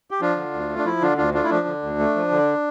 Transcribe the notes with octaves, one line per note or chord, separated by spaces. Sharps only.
G4
F3 D4 F4
D3
D2
A3
D4
F3 E4
D3 D4 F4
D2 D4 F4
A3 D4 F4
E4
F3 D4
D3
D2
A3
F3
D3